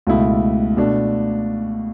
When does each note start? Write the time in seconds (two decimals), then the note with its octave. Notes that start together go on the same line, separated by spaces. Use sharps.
0.07 C#2 B2 A3 E4
0.77 B2 A3 D4